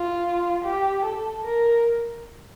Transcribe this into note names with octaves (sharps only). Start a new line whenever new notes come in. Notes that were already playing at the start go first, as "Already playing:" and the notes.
Already playing: F4
G4
A4
A#4